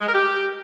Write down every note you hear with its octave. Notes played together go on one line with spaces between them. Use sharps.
G#3
A#4
G4